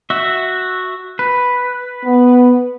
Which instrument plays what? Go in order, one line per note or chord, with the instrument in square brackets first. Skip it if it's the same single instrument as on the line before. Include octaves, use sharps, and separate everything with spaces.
[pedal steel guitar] F#4 E5
B4
[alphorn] B3